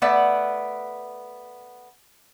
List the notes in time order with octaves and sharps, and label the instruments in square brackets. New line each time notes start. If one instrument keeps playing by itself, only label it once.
[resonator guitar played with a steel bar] A3 B3 D5 E5 F#5